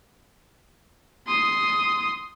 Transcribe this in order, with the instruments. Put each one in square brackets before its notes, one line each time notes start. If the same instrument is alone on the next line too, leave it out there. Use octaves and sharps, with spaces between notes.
[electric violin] C6 D#6